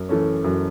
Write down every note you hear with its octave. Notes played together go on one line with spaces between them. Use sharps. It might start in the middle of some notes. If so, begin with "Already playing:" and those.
Already playing: F#2
E3 A3 C#4
F#2